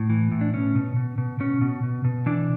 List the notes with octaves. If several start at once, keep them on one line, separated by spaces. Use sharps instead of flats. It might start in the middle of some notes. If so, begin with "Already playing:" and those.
Already playing: A2
E3
A2
D4
B2 C#4
B2
B2
B2
B2 C#4
B2
B2
B2
E3 D4